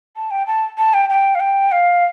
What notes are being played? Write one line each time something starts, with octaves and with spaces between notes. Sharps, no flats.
A5
G5
A5
A5
G5
G5
F5
G5
F5